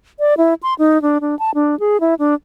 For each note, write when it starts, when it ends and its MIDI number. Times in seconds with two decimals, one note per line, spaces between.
0.19 0.34 74
0.38 0.54 64
0.63 0.74 84
0.79 1.01 63
1.02 1.18 62
1.21 1.37 62
1.39 1.51 81
1.55 1.78 62
1.80 2.00 68
2.00 2.14 64
2.19 2.34 62